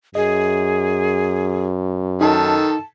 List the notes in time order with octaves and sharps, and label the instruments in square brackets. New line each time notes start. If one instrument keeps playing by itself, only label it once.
[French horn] F#2 [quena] G#4 [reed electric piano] D#5
[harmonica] D#3 A4 [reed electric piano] D#4 [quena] A5